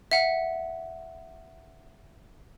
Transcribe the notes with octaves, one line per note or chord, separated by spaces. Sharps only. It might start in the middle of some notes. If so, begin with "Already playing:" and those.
E5 F#5